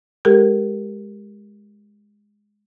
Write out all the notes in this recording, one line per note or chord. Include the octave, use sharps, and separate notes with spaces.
G#3 G4 A4 A#4